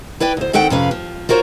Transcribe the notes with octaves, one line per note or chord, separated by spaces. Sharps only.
E4 B4 D5 G5
D2 C5
D#3 C4 A4 F#5 G5
F2 C3 C#4 B4 F5
F3
F4 F#4 A#4 C5 C#5